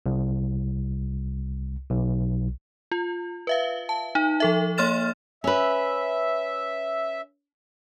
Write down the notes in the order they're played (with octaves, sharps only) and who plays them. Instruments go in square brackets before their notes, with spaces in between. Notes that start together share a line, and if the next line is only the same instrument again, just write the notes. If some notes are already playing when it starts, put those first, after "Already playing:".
[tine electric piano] C2
B1
[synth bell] F4
B4 E5 F5
A5
D#4
F3 A4 E5
A#3 C#5 C6 F6 A6 E7
[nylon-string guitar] C#4 B4 [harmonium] E5